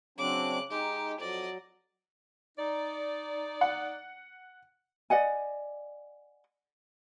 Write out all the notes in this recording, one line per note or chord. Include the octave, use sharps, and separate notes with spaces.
C#3 F#3 C4 D4 D6 F#6
G#3 D#4 G4
F2 F#3 D5 D#5
D#4 D5
F#5
D5 D#5 F#5 G#5